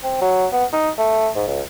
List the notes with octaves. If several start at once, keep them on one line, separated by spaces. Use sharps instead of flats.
C4
F#3
B3
D#4
A3
G#2
C#2